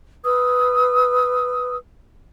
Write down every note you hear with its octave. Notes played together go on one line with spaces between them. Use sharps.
B4 D#6 E6